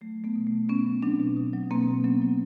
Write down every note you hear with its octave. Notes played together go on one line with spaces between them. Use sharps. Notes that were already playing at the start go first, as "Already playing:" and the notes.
F#3 A3
F#3
A3 B3
B2
B2 A3
B2 B3 C#4
F#3
F#3 C4 D4
B2
B2
F#3
B2 A#3 C4
B2
F#3 B3 C#4
F#3